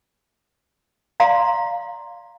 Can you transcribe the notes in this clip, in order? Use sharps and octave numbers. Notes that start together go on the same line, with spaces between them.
D5 F5 A#5 C6